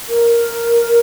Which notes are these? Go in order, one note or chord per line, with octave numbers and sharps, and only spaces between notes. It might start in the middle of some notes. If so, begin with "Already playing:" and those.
A#4